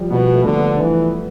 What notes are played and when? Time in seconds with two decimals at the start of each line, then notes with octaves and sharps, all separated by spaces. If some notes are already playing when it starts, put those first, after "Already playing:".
Already playing: F3 G3
0.10 B2 B3
0.34 A3
0.45 D3
0.57 B3
0.80 E3